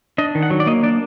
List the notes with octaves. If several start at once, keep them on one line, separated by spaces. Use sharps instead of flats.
D4 D#5
D#3
F#5
F#3
D5
A#3 D#5
D4 D5